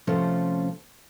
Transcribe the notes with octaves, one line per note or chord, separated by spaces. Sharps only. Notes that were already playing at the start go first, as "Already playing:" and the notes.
C3 F3 A3 C#4 C5